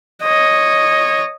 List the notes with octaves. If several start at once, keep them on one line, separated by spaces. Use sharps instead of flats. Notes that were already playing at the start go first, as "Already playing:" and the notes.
C#5 D#5